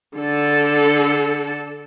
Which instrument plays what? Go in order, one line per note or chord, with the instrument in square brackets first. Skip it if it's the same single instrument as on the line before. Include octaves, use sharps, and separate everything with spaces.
[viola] D3 A4